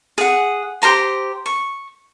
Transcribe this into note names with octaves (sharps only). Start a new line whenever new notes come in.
G#4 F#5
G4 C5 A#5 C6
C#6